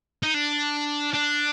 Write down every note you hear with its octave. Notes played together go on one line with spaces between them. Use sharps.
D#4
D4
D4